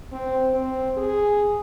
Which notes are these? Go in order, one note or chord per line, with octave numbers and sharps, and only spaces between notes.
C4
C4
G#4